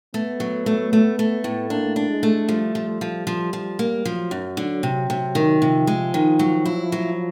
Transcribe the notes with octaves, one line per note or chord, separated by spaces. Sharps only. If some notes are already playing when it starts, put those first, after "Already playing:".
A3 B3
F#3
A3
A3
A3
A2
A#3 D4
D4
G#3
A3
F3 G3
F3
F3
F3
F3
A#3
F3 F#3
F#2
D3
C3
C3
D#3
C3 F3
G#3
D#3
F#3
E4
F#3